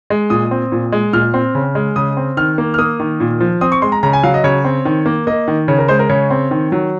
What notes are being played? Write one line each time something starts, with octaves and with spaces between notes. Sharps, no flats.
G#3
A#2 D#6
C4
A#2
G#3
A#2 F6
C4
C#3
G#3
C#3 D#6
C4
D#3 F6
A#3
F6
A#3 D#6
D#3
A#2
F3
C4 D#6
C#6
G#3 C6
A#5
C#3 A#5
G#5
F#3 F5
D#5
C#3 C#5
C4
D#3
A#3
A#3 D#5
D#3
C#3 C#5
A#4
G#3 C5
A#4
C#3 C#5
C4
D#3
F#3